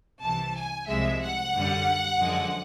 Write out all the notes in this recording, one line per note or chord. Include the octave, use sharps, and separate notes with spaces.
C2 C3 E3 A5
G#5
C2 C3 F3 G#3 E5
F#5
F#2 D3 G3
F#2 D3 F3 G#3